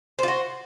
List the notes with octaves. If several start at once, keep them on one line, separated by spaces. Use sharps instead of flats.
F4 F#4 C5